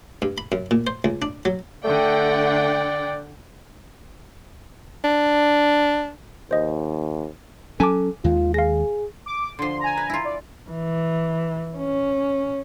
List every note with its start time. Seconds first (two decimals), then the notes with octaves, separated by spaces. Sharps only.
0.22 G2
0.38 B5
0.52 F#2
0.71 A#2
0.87 C5
1.04 C#2
1.22 D4
1.45 F#3
1.85 D3 A3 D5 F#5 G5
5.04 D4
6.51 D#2 C5 D#5
7.80 F#3 C#4 A4 G#5 A5 D6
8.24 D#2 D#3 G#3 F4
8.54 G#4 F5 A#6
9.26 D6
9.59 D3 F3 C6
9.80 G#5 A#5
9.97 B4
10.10 E4 F4
10.25 D5
10.70 E3
11.77 C#4